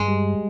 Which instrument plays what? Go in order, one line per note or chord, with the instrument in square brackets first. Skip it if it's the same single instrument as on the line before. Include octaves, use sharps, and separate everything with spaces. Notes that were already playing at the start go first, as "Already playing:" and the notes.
Already playing: [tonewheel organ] G2 [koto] G#3
[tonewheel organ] G3